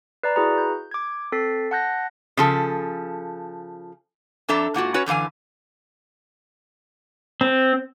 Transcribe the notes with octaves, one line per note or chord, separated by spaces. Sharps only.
B4 D5 A#5
E4 F#4 G#4 B4 A#5
G6
D6 G#6
C4 A4 A6 B6 C7
F#5 A5 F#6 G6 A#6
C#3 F3 A4
F2 D4 A4 E5 A#5
G#2 A#3 F4 F#4
C#4 F#4 B4 C#5
F#2 D3 E3 F5 G#5
C4